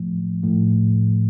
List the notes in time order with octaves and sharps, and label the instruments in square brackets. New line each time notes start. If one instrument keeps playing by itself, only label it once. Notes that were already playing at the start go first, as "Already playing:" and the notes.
Already playing: [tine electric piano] A2 F3 A3
A2 F3 A3